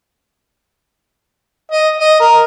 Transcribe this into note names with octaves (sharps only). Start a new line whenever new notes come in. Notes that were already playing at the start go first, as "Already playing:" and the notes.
D#5
D#5
A#4